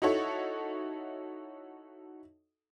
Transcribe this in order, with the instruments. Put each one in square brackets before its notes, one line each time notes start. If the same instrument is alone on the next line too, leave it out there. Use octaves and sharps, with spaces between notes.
[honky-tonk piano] D#4 E4 F#4 A4 C#5